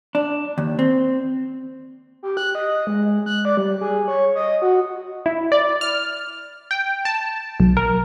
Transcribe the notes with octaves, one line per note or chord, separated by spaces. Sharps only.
D4
D#2
C4
G4
F#6
D#5
G#3
F#6
D5
G3
G#4
C#5
D#5
F#4
E4
D5
F6
G5
A5
B1
A#4